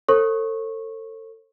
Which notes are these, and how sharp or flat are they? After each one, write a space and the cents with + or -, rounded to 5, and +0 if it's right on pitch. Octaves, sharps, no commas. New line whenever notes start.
A4 +30 C5 +45 C#6 -20